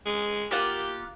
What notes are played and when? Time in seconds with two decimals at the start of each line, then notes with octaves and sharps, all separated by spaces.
0.06 G#3
0.51 A#3 F4 G4 F#5